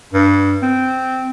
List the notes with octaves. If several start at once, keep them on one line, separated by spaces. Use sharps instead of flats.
G2
C4